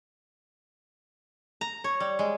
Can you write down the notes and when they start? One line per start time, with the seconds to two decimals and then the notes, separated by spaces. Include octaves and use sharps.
1.61 A#5
1.84 C#5
2.00 G3
2.19 G#3